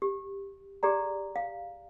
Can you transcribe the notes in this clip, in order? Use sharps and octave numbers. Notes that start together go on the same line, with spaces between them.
G4
G4 G#4 D5 A#5
F5